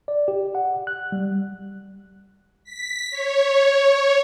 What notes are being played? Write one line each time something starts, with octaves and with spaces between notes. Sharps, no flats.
D5
G4
F#5
F#6
G3
B6
C#5